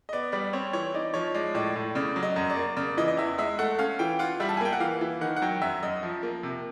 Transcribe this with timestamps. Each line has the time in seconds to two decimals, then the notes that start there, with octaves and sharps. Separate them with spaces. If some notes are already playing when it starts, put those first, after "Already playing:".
0.09 D#5
0.13 B3 D5
0.32 G3 D5
0.53 C4 C#5
0.73 E3 C#5
0.94 D#4 D5
1.14 F3 C#5
1.34 G#3 D5
1.55 A2 D5
1.76 A2
1.95 C#3 D5
2.16 F#3
2.23 D#5
2.36 F#2
2.50 D5
2.57 A#3
2.77 C#3 D5
2.97 E3 D#5
3.08 D#5
3.17 E2 E5
3.38 G#3 E5
3.59 A3 F#5
3.79 C#4 F5
3.99 E3 G5
4.19 F4 F#5
4.40 G3 E5
4.49 A5
4.57 G#5
4.61 A#3 G5
4.73 F#5
4.80 E3 F5
5.01 E3
5.21 D#3 F#5
5.36 F#5
5.42 F#3 G5
5.62 F#2 E5
5.83 F#2 D#5
6.03 F3
6.23 A#3
6.43 C3